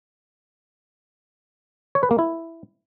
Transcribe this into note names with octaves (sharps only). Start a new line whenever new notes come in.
C#5
B4
A#3
E4